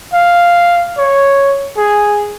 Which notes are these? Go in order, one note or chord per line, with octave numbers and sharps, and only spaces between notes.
F5
C#5
G#4